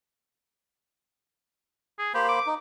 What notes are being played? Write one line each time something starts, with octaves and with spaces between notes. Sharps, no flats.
G#4
A#3 G4 C5 B5
D6
D#4